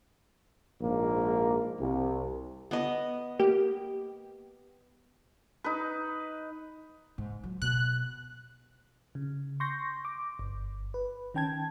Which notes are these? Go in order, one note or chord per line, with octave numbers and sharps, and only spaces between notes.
A#1 G#2 A#3
C2
B3 D#5
A#3 G4
D#4 B4
G#2
F#3
B2 F#6
C#3
C6 C#6 G6 A#6
D6
G1
B4
D#3 C#4 G5 A5 G#6